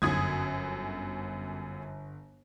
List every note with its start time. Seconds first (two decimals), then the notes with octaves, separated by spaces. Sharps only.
0.02 G1 F#2 D#6 G#6